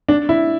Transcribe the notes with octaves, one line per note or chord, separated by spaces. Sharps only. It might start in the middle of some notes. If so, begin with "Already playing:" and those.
D4
E4